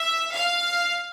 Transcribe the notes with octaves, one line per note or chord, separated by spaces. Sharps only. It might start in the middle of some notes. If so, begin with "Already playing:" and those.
Already playing: E5
F5